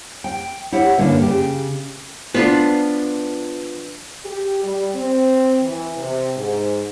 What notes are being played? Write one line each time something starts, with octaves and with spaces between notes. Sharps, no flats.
G5
E4 G4 C#5 F#5
G2 D3 A#3 C#4
C#3 G4
F3 B3 D4 F4 B4
G4
G3
C4
E3
C3
G#2